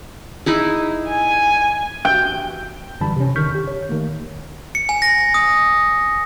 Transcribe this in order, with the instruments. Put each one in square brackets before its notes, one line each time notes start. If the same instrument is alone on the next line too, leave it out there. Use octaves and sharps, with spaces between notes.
[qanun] D#4 E4 G#4
[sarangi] G#5
[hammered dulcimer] G5
[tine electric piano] F#2 D3 E3 G3 A5 B5
C3 C#4
D3 D#3 C#6 F6 G6 B6
G4
C#5
D#3 A3 A#3
[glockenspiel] C#7
G#5
A#6
D#6